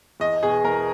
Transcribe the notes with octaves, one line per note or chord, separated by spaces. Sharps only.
E2 D#5
B2 G#4
E2 A#4